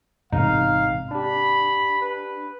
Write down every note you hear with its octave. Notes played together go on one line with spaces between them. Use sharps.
A1 G#2 C3 D#4 F5
D4 G4 B5
B4